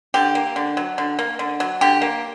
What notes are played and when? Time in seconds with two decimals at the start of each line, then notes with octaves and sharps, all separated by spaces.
0.14 D3 G4
0.35 A#3
0.56 D3
0.77 F#3
0.98 D3
1.19 A#3
1.39 D3
1.60 F#3
1.81 D3 G4
2.02 A#3